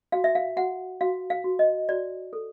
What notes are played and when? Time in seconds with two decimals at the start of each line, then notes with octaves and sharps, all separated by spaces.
0.12 F#4 F5
0.24 E5
0.35 F5
0.57 F#4 F#5
1.01 F#4 F5
1.30 F5
1.44 F#4
1.59 D#5
1.88 F#4 D5
2.33 A4